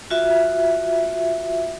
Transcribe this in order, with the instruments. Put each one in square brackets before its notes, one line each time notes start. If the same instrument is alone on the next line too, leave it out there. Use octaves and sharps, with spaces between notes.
[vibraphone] F4 F#4 E5